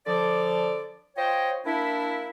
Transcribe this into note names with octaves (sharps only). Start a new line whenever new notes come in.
D3 F3 D5
F4 C5 C#5 D#5 G5
A#3 D4 E4